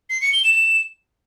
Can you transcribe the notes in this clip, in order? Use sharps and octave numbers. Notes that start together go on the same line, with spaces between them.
C7
C#7
G7
E7